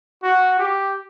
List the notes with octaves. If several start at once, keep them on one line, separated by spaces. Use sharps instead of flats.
F#4
G4